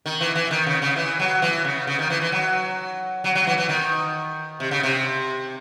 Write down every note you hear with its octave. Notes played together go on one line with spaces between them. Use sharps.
D#3
E3
E3
D#3
C#3
C#3
E3
F#3
E3
C#3
C#3
D#3
E3
E3
F#3
F#3
F#3
E3
E3
D#3
C3
C#3
C3